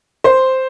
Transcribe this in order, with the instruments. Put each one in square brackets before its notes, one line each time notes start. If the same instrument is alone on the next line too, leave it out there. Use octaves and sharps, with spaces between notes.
[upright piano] C5